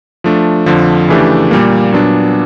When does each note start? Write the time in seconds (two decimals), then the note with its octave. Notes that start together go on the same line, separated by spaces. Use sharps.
0.24 F3 A3 D4
0.66 F2 D3 F3
1.08 C#3 E3 A3 D4 G4
1.51 A#2 G3 A#3
1.92 A#2 F#3 B3 D4